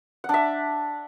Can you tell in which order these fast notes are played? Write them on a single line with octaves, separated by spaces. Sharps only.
F#5 D4 E5